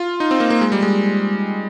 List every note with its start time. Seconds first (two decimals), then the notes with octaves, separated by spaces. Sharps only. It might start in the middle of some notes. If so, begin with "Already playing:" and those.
Already playing: F4
0.20 D#4
0.31 C4
0.40 A#3
0.50 A#3
0.61 G#3
0.72 G3
0.82 G#3